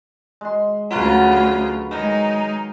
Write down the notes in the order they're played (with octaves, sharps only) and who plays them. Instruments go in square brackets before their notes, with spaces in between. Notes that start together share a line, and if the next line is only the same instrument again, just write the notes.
[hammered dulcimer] G#3 C6
[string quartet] D2 C#3 F4 [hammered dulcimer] F#3 B4
[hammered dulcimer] D#3 [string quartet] G#3 D#4